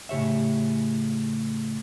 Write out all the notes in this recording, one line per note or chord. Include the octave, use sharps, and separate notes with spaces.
A2 C#3 G4 C#5 E5